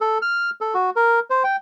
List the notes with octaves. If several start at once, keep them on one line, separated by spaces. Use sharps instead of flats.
A4
F6
A4
F#4
A#4
C5
G5